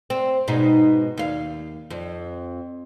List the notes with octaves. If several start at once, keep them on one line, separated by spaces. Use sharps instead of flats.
C4
G#2 B2 D#4
D#2 F5
F2